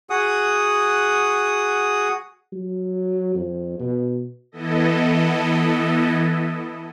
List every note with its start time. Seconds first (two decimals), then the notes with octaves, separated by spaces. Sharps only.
0.10 F#4 G#4 F#5 D#6
2.53 F#3
3.35 F2
3.79 B2
4.52 E3 B3 E4 A4 D#5